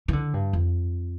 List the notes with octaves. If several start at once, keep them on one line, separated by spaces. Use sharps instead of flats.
E3
D3
G2
F2